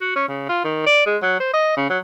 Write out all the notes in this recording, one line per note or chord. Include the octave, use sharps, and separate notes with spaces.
F#4
C#4
C#3
F4
D#3
D5
G#3
F#3
C5
D#5
C#3
F#3